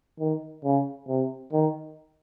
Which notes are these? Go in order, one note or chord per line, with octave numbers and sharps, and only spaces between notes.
D#3
C#3
C3
D#3